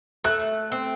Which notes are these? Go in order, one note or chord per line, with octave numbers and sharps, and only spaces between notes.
A3 F#6
C4